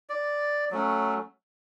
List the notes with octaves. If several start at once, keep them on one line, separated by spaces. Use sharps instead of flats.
D5
F#3 A3 C#4